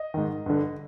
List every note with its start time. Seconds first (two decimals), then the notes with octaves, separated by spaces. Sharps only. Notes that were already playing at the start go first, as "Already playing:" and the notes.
Already playing: D#5
0.14 G#2 D#3
0.46 G2 D3